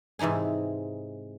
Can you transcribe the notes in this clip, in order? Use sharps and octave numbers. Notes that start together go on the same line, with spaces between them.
G#2 C3 E3 D#4 G#5